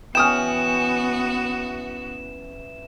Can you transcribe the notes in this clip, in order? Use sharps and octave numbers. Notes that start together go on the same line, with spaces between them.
E3 B3 C#4 F#4 G5 D#6 F6 E7